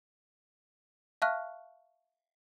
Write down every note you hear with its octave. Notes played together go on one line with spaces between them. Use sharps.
E5 F5 A5 C#6 F6 F#6